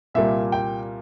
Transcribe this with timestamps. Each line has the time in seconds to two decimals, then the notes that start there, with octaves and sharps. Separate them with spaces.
0.14 C2 A#2 G3 A#3 E5
0.52 G5